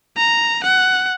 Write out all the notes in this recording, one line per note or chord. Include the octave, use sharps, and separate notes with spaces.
A#5
F#5